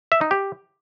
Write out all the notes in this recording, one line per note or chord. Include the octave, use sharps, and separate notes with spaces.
E5
D#4
G4